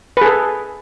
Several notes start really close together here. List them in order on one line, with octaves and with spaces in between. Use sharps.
B4 G#4 A4